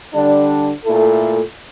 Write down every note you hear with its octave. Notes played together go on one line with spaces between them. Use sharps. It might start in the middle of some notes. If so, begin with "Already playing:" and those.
D3 G3 D4
A#2 A3 E4 A4